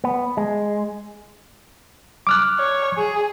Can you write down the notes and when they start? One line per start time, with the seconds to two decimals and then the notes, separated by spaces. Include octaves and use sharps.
0.04 B3
0.37 G#3
2.27 D6 F6 F#6
2.58 C#5
2.97 G#4